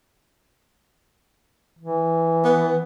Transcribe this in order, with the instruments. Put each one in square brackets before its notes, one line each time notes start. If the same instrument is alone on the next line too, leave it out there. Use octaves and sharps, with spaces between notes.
[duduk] E3
[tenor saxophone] B3